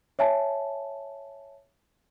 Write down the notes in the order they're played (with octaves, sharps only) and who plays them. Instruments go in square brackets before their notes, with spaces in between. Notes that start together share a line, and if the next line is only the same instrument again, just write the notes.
[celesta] C#5 E5 G#5 A5